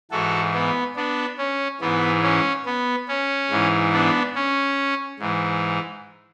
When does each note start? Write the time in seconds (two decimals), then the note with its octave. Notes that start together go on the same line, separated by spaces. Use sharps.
0.11 G#2 E3 F#4 A4
0.54 B3
0.96 B3 D4
1.38 C#4
1.80 G#2 E3 B3
2.23 C#4
2.66 B3
3.08 C#4
3.50 G#2 E3
3.93 B3 D4
4.35 C#4
5.19 G#2 E3